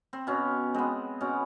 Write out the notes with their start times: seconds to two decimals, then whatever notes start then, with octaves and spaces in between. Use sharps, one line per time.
0.13 C4
0.27 B2 C#4
0.74 G#3 B3 C4
1.21 B2 C#4